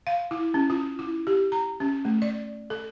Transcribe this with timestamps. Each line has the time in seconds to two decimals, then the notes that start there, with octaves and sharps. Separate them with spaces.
0.07 F5
0.31 E4
0.54 C#4
0.70 F4
0.99 E4
1.27 G4
1.52 A#5
1.80 C#4
2.05 A3
2.22 D5
2.70 A4